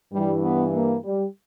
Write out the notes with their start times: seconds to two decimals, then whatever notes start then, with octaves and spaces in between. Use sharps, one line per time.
0.13 G2 E3 G3
0.43 B3
0.73 A#3
1.04 G3